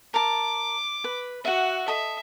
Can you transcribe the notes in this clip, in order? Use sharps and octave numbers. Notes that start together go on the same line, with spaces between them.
A#4 A5 D6
B4
F#4 E5 F#5
A4 D#5 E5